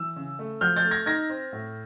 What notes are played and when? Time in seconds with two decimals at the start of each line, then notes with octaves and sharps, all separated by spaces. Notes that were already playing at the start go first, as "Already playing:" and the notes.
Already playing: E3 E6
0.16 C#3
0.39 A3
0.61 F3 F6 G6
0.76 G6 A6
0.85 A3
0.91 G#6 A#6
1.06 D#4 G#6 A#6
1.30 C4
1.53 A2